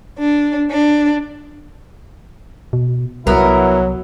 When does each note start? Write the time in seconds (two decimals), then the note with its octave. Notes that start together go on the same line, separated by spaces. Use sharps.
0.17 D4
0.69 D4
2.73 B2
3.27 C2 F#3 B3 E4 A#4